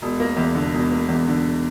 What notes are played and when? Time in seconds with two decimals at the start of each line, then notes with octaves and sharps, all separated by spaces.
0.02 E1
0.20 A#3
0.37 E2
0.55 D3
0.74 E1
0.91 A#3
1.09 E2
1.27 D3